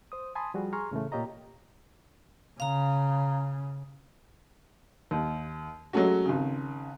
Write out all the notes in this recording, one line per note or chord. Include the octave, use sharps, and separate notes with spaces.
C5 D#6
G#5 A5 B5 C6 D#6
F3 G3 F#4 G#4
G#4 G#5 A#5 C6 C#6 F6
A2 C#3 E3 A3
A#2 F4 G4 C#5 D#5 A#5
C#3 F5 A#5
D#2
F#3 G#3 A3 C#4 F#4
G#1 C#3